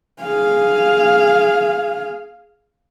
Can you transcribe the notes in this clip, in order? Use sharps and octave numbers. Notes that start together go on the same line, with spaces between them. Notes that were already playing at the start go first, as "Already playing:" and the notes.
G#4 F5